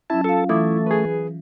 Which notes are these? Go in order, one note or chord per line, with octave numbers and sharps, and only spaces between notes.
F#3 C#4 E4 A5
F4 A4 F5
E3 A3 E4 D6 D#6
G#4 B4